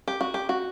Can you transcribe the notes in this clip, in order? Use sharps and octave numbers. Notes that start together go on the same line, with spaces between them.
G4
F#4
G4
F#4